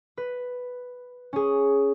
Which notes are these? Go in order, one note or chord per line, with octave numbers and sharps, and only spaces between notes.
B4
C#4 G#4